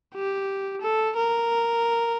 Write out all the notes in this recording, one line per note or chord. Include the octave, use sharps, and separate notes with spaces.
G4
A4
A#4